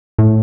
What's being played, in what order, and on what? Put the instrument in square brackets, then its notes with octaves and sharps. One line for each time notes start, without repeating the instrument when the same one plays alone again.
[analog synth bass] A2